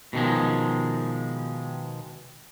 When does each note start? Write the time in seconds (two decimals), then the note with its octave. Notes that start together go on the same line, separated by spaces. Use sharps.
0.13 B2 D#3 F3 G#3